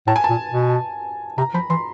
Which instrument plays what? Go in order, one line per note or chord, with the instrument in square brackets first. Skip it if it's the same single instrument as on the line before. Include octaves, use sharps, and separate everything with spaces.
[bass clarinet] A2 [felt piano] A5
[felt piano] G#5
A5
[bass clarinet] A#2
B2
[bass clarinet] C3 [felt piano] A#5
[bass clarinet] F3 [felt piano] B5
[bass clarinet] E3 [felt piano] C6